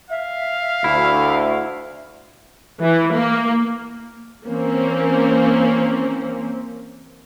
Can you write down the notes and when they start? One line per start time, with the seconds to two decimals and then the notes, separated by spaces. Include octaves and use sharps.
0.10 E5 F5
0.84 D2 E4
2.81 E3
3.12 A#3
4.46 E3 A#3 C4 C#4